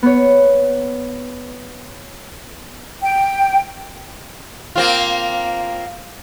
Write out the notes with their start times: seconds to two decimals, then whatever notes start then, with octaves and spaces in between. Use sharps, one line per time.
0.03 B3 C#5
3.02 G5
4.75 A#3 C4 F4